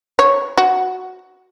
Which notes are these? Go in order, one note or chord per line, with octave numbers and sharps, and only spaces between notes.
C#5
F#4